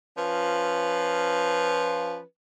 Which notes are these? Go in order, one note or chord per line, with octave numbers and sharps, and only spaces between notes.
F3 C#4 F4 B4